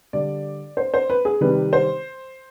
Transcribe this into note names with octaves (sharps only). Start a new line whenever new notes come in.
D3 G3 D5
C5
C5
B4
G#4
C3 D#3 G3 B4
C5